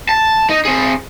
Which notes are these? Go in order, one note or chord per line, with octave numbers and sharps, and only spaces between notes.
A5
D#4
C4 G#4